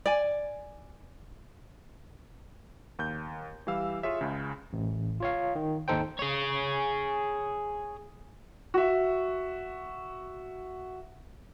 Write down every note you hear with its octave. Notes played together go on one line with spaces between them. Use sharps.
D5 G#5
D#2 G6
E3 G3 G4 F5 E6
F4 G#4 C#5 E5
C#2 C#3
A1
F4 C#5 F5
D#3
G#1 D#2 D#4 A4 C5 G5
G#4 C#5
F#4 E5